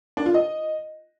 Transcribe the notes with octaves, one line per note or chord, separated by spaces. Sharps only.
D4
F4
D#5